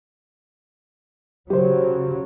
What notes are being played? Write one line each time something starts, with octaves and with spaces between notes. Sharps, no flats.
C#3 F#3 G4 C5